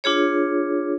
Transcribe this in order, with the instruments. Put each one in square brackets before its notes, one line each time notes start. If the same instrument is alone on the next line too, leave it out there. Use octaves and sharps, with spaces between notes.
[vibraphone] D4 F4 G#4 C#5